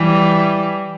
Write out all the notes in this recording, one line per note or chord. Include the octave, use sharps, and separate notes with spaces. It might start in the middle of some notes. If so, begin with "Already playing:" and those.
Already playing: E3 G3